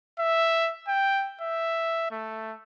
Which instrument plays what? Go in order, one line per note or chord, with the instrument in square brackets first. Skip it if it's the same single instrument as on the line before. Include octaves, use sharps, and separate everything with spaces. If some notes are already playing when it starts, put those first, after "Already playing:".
[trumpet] E5
G5
E5
A3